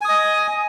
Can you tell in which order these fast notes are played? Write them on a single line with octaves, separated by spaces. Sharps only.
G#5 D#6 D#5